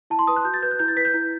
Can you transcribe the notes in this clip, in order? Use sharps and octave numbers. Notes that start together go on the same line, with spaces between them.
E4 A5
C6
B4 D#6
F#6
F#4 G6
A6
B4 G6
F#6
E4 G6
A6
B4 B6
G6
E4